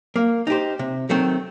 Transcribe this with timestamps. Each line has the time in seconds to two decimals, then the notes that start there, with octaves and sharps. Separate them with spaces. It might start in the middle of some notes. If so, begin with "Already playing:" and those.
0.16 A#3
0.47 D#4 G4 C5
0.79 C3
1.09 D#3 F#3 A3 C4